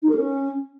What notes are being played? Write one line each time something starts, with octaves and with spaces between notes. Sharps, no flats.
D#4
A#4
C#4